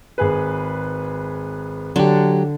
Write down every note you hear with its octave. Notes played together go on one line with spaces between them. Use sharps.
G#1 G#4 B4
D3 F#3 G4